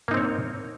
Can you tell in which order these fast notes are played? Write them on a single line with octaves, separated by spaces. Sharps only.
A#3 D#4 C4 C#5